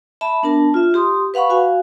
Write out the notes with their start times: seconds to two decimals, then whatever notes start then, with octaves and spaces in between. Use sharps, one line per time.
0.21 E5 A5 B5
0.43 B3 D4 A#4 A5
0.74 F4 E5
0.94 G4 C6 D#6
1.34 B4 F5 F#5 B5 C#6
1.49 F#4 F5 G#5